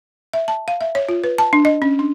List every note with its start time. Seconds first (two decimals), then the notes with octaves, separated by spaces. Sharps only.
0.33 E5
0.48 A5
0.68 F5
0.81 E5
0.95 C#5
1.09 F4
1.24 B4
1.38 A5
1.53 D4
1.65 D#5
1.82 C#4
1.99 D4